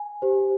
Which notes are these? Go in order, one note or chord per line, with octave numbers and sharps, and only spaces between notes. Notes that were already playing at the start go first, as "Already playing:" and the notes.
Already playing: G#5
G4 C5